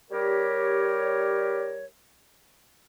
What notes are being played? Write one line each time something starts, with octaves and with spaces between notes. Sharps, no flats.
G3 G4 A#4 C#5